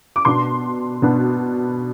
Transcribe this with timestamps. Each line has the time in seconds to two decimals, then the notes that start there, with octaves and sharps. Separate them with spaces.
0.16 D6
0.25 B2 B3 D4 C6
1.02 B2 B3 D4